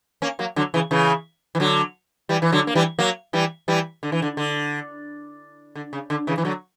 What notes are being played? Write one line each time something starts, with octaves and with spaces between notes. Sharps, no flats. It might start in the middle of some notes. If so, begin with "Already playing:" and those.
A#3 C#4
F#3 A#3
D3 F#3
C#3 E3
C#3 E3
E3
D3 F#3
E3 G3
E3
D3 F#3
A#3
E3 G3
F#3 A#3
E3 G3
E3 G3
D3
E3
D3
D3
D3
C#3
D3
C#3 E3
E3
D3 F#3